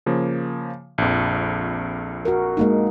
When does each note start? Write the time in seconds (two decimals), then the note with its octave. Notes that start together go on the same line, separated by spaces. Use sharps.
0.06 C#3 F3 A#3
0.98 A#1 F2
2.25 F#4 A#4
2.57 G#3 A#3 D#4